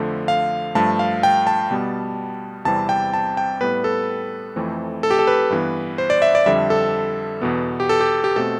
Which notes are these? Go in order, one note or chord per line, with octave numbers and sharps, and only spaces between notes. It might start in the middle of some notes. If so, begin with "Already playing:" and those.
Already playing: F2 D3 F3 A3
F5
G2 F3 A3 A5
F5
G5
A5
B2 G3 B3
E2 C3 E3 G3 C4 A5
G5
A5
G5
A2 G3 B3 B4
A4
F2 E3 A3 C4
A4
G4
A4
B4
G2 E3 B3
C5
D5
E5
D5
F2 D3 G3 E5
A4
E2 B2 B3
G4
A4
G4
G4
B2 A3 C4 A4